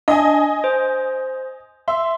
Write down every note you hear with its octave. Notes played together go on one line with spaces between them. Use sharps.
D4 D#5 G#5
C5
E5 C6